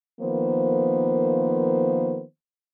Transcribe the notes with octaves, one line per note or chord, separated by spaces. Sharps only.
D#3 F3 A#3 B3 C5